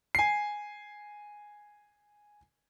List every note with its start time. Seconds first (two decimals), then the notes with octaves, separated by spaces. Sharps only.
0.15 G#5 C7